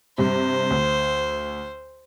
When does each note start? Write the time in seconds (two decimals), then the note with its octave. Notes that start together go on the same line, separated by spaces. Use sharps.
0.18 G2 C3 C5
0.70 D2